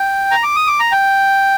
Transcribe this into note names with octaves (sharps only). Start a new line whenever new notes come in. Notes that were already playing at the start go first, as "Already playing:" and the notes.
Already playing: G5
A#5
D6
D#6
D6
A#5
G5